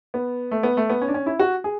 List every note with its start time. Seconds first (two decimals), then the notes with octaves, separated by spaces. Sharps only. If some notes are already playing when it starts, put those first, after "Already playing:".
0.14 B3
0.51 A3
0.63 B3
0.77 A3
0.90 B3
1.02 C#4
1.08 D4
1.14 C#4
1.26 E4
1.39 F#4
1.64 G#4